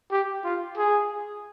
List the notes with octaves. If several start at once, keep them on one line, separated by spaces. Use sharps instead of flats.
G4
F4
G#4